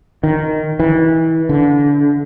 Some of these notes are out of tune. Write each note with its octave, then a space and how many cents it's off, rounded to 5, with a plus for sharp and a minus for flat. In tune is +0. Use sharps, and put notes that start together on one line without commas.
D#3 -5
E3 -25
D3 -30